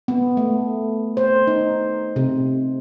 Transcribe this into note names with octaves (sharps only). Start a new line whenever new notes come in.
B3
A3
C5
D#4
C3